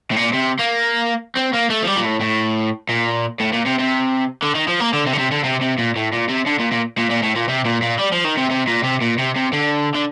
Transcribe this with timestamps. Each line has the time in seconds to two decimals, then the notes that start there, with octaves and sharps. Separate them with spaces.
0.11 A2
0.16 A#2
0.34 C3
0.59 A#3
1.36 C4
1.53 A#3
1.70 A3
1.83 F3
1.87 G3
1.96 A#2
2.04 A2
2.21 A2
2.89 A#2
3.40 A2
3.53 A#2
3.66 C3
3.79 C3
4.42 D3
4.55 D#3
4.68 F3
4.80 A#3
4.93 D3
5.06 C3
5.13 D3
5.18 C3
5.32 D3
5.44 C3
5.62 C3
5.78 A#2
5.96 A2
6.12 A#2
6.29 C3
6.46 D3
6.59 A#2
6.72 A#2
6.98 A#2
7.10 A#2
7.23 A2
7.36 A#2
7.49 C3
7.65 A#2
7.82 A#2
7.99 G3
8.13 F3
8.25 D#3
8.38 C3
8.51 C3
8.68 A#2
8.84 C3
9.02 A#2
9.19 C3
9.36 C3
9.53 D3
9.95 D3